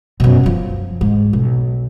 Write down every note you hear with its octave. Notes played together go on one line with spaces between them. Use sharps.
F#2 B2
F#2 F3
G#2
B1